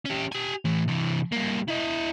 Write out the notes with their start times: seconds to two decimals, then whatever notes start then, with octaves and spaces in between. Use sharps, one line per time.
0.06 C#4 G4
0.32 G4 G#5
0.65 A2 E3
0.88 C3 E3
1.32 G2 A#3
1.68 E4 D#5